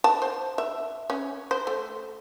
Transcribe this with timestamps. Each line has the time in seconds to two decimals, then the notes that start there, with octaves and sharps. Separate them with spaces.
0.04 A5
0.22 C5
0.58 E5
1.10 C#4
1.51 C5
1.67 A3